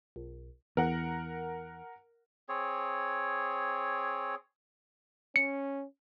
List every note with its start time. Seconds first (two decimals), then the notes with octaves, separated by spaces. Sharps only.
0.16 B1
0.77 E2 A#4 F#5
2.49 C4 G#4 C#5
5.36 C#4 C#7